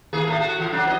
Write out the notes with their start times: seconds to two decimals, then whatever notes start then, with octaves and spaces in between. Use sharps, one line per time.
0.13 D#3 A#3 G#4
0.27 A2 A3
0.40 A3 F#4
0.55 A2 E3
0.72 F#3 D4
0.85 E4 C5 D#5